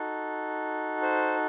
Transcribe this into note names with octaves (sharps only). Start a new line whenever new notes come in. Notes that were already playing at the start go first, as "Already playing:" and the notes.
Already playing: D#4 F#4 A4
C5